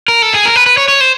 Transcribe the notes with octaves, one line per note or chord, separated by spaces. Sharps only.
A#4
A4
G#4
A#4
B4
B4
C#5
C#5
C5